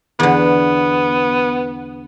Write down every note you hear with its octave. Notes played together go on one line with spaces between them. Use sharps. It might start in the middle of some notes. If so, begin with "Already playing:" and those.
E2 D3 B3